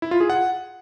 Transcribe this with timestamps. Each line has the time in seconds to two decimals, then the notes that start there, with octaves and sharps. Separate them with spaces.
0.02 E4
0.11 F4
0.20 G#4
0.30 F#5